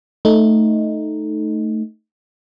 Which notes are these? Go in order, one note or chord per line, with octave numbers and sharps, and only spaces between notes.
A3 D#4